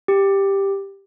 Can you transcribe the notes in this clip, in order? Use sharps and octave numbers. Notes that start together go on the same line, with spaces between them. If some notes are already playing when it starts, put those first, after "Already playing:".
G4